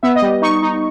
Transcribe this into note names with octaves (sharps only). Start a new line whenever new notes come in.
B3 E5
D#5
G3
D#4 C#6
D#4